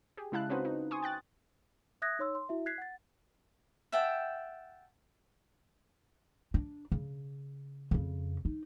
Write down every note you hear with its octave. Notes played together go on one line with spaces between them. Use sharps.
G4 G#4
C#3 G#3 E4 F5 A5 F#6
C4 C#4 D#4 F#4 B4 C5
D#4
G#5 C6 C#6 D#6
G5 F#6 A6
E5 D#6 F#6 G#6 A#6
D#4 C#5 C6 E6
C6
E4 F#4 E5
F#6 G#6 B6 C7
F#5 A6
E5 F#5 G5 A5
D4
C#3
F2 C#3
D#4